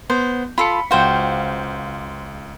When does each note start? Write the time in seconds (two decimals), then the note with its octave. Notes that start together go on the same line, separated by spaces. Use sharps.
0.10 B3 C5
0.58 F4 A4 B5 C#7
0.91 C#2 F#4 C5 F5 G5